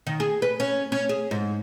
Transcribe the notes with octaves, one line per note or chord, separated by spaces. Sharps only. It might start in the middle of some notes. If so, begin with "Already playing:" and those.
D#3
G#4
B4
C#4
C#4
G#4
G#2